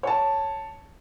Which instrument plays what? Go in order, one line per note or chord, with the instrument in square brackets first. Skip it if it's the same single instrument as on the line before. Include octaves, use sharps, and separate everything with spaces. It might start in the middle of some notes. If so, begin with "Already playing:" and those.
[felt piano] C#5 A5